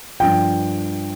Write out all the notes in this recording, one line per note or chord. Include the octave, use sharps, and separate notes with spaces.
G2 F3 G5